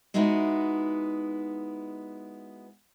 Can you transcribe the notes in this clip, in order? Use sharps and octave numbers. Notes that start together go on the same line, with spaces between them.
G#3 B3 D#4 E4 F#4